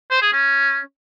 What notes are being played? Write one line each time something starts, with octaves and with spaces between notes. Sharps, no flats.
C5
G#4
C#4